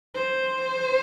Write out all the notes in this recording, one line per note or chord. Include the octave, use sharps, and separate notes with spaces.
C5